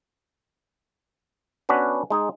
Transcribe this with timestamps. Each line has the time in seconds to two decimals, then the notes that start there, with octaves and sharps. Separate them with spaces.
1.69 B3 C#4 D4 F#4 B4
2.10 G#3 D#4 G#4